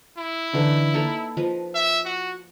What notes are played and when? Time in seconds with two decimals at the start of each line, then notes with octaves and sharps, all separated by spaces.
0.18 E4
0.53 D3 E3 D#4
0.94 A#3 D#4 A4
1.37 F3 B4 D#5
1.75 E5
2.06 F#4